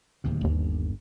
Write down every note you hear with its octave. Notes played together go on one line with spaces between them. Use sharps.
D1 D#2 C3
G1 D#2